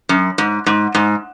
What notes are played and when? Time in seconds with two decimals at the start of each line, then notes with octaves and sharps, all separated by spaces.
0.09 F#2
0.38 G#2
0.66 G#2
0.95 G#2